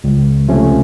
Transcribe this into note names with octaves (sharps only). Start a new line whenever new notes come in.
C#2
C3 F3 A3 C#4